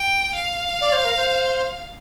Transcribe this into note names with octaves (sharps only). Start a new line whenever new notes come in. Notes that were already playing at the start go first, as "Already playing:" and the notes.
Already playing: G5
F5
D5
C5
A#4
C5